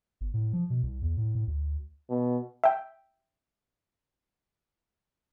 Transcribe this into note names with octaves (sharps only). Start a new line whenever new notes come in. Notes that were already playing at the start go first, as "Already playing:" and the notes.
G1
A2
F3
B2
C2
E2
A2
A2
D2
B2
E5 G5